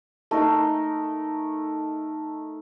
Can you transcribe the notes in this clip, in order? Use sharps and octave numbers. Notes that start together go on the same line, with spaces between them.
A3 D#4 A#4